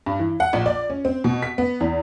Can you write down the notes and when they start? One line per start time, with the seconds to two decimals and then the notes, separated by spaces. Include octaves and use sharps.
0.06 G2
0.19 E3
0.40 F#5
0.53 A#1
0.66 D5
0.90 C#4
1.05 C4
1.24 B2
1.42 B6
1.58 B3
1.80 E2